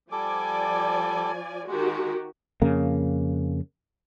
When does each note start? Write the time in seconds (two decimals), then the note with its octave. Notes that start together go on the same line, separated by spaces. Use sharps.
0.12 F3 G3 A4 D5 G#5 D6
1.67 D#3 G#3 F#4 G4
2.62 F2 C#3 A#3